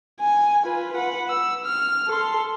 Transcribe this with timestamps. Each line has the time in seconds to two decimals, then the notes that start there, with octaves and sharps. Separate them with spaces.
0.20 G#5
0.65 F4 B4
0.93 B4 F#5
1.29 E6
1.65 F6
2.08 A4 C6